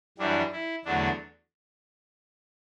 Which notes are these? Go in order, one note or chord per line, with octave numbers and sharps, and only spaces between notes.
F#2 E3 G3 D4
E4
E2 D3 F#3 A3 D4